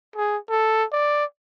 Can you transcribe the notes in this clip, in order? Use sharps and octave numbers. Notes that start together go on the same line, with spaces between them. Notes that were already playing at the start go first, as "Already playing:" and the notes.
G#4
A4
D5